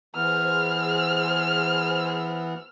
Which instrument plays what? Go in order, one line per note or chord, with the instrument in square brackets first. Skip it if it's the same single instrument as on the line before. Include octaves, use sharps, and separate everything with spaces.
[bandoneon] E3 B3 [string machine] G#4 C5 [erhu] F6